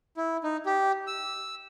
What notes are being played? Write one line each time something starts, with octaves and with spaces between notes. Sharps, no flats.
E4
D#4
G4
E6